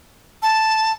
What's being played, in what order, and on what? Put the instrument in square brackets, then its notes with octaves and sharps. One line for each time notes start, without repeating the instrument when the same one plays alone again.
[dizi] A5